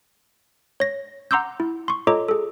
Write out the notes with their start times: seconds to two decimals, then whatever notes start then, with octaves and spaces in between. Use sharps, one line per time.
0.80 C#5 A#6
1.31 F#5 A#5 C6 D6 E6 G6
1.60 E4
1.88 C6 C#6
2.07 F4 A4 C#5 D#5 A#5 D6
2.28 G#4 A4